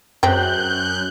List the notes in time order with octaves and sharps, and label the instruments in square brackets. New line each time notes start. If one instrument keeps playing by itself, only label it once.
[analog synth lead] F#2 [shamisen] G#3 C4 G4 [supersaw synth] F#6 G6